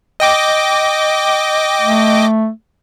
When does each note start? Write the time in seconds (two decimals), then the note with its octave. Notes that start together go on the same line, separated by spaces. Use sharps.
0.20 D#5 G5 D6
1.81 A3